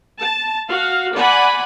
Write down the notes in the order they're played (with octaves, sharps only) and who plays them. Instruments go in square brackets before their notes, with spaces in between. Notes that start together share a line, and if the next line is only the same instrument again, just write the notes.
[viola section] A5
F#4 F5
D5 F#5 G#5 B5